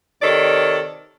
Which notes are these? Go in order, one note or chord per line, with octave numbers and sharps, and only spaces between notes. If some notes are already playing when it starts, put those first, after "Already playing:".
C3 D#3 A4 C#5 D5